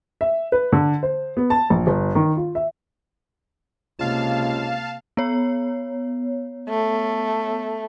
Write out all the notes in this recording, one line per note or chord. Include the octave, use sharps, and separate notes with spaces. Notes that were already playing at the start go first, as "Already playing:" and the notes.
E5
B4
D3
C5
B3
A5
A#1
G1
D#3
F4
E5
C#2 C3 A#3 F5 A5
B3 C#5
A3